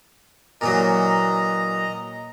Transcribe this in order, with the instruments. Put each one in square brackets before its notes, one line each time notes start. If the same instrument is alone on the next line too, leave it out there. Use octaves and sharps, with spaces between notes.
[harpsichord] A#2 E3 F#3 [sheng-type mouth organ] D#5 A#5